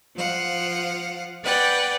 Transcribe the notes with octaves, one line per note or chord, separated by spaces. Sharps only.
F3 F5 F#5
B4 D5 F#5 G5